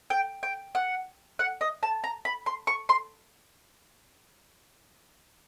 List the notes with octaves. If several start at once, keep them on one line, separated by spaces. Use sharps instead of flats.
G5
G5
F#5
F#5
D#5
A5
A#5
B5
C6
C#6
C6